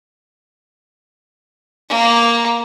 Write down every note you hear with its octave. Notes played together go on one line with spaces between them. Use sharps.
A#3